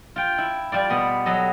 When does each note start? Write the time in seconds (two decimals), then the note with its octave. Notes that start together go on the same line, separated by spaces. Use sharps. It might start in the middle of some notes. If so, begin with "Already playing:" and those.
0.16 F4 G5
0.38 E4
0.72 G3 F4 D5
0.90 B2 B3
1.26 F#3 A4 D#5